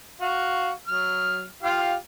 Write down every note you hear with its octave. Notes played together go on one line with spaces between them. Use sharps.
F#4 F5
F#3 F6
F4 G4 F5